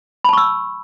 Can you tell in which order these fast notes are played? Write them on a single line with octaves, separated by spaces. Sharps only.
B5 A5 C#6 E6